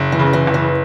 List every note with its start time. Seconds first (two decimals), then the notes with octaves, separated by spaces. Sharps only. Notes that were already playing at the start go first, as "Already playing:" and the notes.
Already playing: F#1
0.12 E3
0.19 C#3
0.33 E3
0.47 F#1
0.54 E3